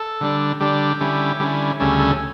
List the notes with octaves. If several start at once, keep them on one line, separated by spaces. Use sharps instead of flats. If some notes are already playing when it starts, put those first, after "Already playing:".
Already playing: A4
D3 G3 D4
D3 G3 D4 G4
D3 G3 C#4 E4
D3 G3 C#4 E4
D2 C#3 G3 C#4 A4
A4